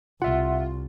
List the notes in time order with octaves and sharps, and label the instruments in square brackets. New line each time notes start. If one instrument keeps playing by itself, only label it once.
[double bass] C2 [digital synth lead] F4 [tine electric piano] E5 F#5